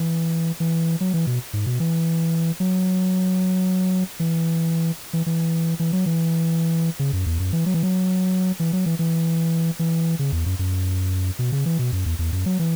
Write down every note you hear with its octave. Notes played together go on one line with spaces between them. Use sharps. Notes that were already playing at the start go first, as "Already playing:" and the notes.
Already playing: E3
E3
F#3
E3
B2
G#2
B2
E3
F#3
E3
E3
E3
E3
F#3
E3
C#3
F#2
E2
F#2
E3
F#3
E3
F#3
E3
F#3
E3
E3
E3
C#3
E2
F#2
F#2
B2
C#3
E3
B2
F#2
E2
E2
F#2
F#3
E3